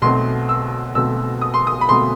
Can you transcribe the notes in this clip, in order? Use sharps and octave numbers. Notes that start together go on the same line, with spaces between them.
B1 B2 A3 C4 C6
E6
B1 B2 A3 C4 E6
D#6
C6
D#6
B5
B2 A3 C4 C6